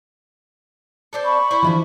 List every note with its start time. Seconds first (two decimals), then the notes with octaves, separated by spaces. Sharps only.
1.13 C4 D4 A4
1.24 B5 C#6
1.50 E4 C5
1.62 D3 E3 F3